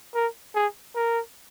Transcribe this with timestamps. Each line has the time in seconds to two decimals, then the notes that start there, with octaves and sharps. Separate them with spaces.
0.15 A#4
0.55 G#4
0.95 A#4